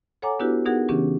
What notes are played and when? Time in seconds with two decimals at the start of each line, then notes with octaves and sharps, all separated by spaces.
0.22 A4 C#5 F#5 G#5 A#5 D6
0.39 B3 D4 E4 F#4 G4 B4
0.65 B3 D#4 F#4 G#4 A#4 F#5
0.89 C#3 E3 B3 C#4 D4 G4